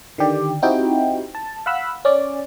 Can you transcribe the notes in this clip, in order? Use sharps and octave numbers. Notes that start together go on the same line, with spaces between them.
D3 D#3 G4 D5
C4 D#4 E4 F#4 G4 G5
A5
F5 F#5 B5 E6
C#4 D5